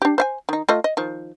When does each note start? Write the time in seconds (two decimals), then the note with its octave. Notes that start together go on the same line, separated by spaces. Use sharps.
0.02 D4 G4
0.18 C5 F5 G#5
0.49 D#3 D#4
0.69 A3 F4 D#5
0.84 D#5
0.97 D#3 F3